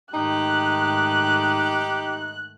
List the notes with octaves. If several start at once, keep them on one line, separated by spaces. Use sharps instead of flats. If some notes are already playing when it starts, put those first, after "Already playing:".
G#2 D#3 A3 D#4 G4 F#6